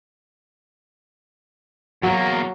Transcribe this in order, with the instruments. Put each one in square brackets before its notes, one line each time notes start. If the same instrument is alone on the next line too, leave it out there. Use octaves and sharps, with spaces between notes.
[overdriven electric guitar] E2 A#3 [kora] F#3